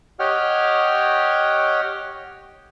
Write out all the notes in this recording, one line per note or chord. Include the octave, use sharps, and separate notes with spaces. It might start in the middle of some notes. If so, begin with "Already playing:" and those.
G4 C#5 D#5 F#5 G5 F6